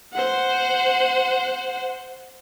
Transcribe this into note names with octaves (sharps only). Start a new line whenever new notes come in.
C5 F#5